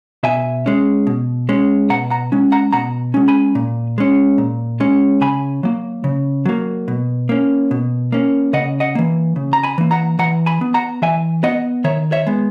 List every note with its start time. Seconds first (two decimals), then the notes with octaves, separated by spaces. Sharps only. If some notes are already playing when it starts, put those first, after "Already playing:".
0.23 B2 E5 G#5
0.66 G#3 C#4
1.07 B2
1.49 G#3 C#4
1.90 B2 F#5 A#5
2.10 F#5 A#5
2.32 G#3 C#4
2.52 F#5 A#5
2.73 B2 F#5 A#5
3.14 G#3 C#4
3.28 G#5 B5
3.55 A#2
3.98 G#3 C#4
4.38 A#2
4.80 G#3 C#4
5.21 C#3 G#5 B5
5.63 F#3 A#3
6.04 C#3
6.46 F#3 A#3
6.88 B2
7.29 A#3 C#4
7.71 B2
8.12 A#3 C#4
8.53 C#3 D#5 F#5
8.80 D#5 F#5
8.95 E3 A#3
9.36 C#3
9.53 A#5
9.63 G#5 B5
9.78 E3 A#3
9.91 F#5 A#5
10.19 E3 F#5 A#5
10.46 G#5 B5
10.61 B3
10.74 F#5 A#5
11.02 E3 E5 G#5
11.43 B3 D#5 F#5
11.84 D#3 C#5 E5
12.12 C#5 E5
12.27 G#3 B3